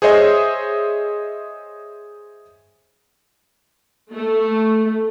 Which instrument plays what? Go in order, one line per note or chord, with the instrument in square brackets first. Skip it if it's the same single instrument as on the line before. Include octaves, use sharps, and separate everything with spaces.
[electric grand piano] G#4 C5 C#5 D#5 E5
[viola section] A3